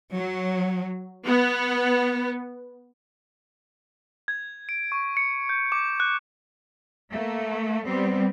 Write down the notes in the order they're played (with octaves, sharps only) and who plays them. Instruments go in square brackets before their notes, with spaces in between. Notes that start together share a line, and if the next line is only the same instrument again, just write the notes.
[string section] F#3
B3
[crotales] G#6
D7
C#6
C#7
G6
D6
F#6
[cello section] A3 A#3
G3 B3 C4